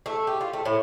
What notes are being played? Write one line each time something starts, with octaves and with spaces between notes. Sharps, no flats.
A3
G4
F4
A3
A2